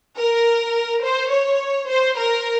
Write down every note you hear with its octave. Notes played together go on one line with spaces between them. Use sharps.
A#4
C5
C#5
C5
A#4